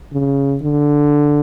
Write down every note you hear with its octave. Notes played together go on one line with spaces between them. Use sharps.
C#3
D3